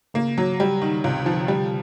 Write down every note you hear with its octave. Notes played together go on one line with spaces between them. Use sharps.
C#3 A#3
F#3
G3
D#3
C#2 C3
D3 F3
G3